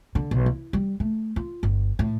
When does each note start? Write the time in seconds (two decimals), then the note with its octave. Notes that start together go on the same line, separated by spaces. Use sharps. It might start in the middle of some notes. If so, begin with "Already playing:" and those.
0.15 D3
0.31 B1
0.46 E4
0.73 G3
1.00 A3
1.36 F4
1.63 G1
1.99 A2